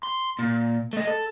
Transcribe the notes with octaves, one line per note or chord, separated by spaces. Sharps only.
C6
A#2
A3 D#5
A4